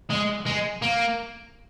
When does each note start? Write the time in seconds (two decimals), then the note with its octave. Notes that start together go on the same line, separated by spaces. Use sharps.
0.10 G#3
0.46 G#3
0.82 A#3